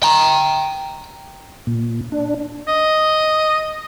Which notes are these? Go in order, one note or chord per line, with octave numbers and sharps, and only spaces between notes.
G5 A#5
A#2
D4
D#5